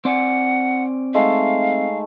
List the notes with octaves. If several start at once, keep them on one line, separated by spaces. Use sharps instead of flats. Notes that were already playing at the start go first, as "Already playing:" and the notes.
C4 D5 F#5 G#5
G#3 A3 D#4 F5